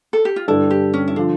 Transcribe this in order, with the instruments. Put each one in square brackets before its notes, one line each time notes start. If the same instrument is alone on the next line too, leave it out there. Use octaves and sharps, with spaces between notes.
[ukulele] A4
G4
F4
[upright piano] G2 D3 G3 D4 A4 [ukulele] E4
[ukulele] G4
C#4
E4
[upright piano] D3 F3 [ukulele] D4